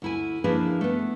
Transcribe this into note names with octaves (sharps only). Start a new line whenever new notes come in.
D2 E4 G#5
F3 A#3 D4 E4 G#4 B4
A3 B3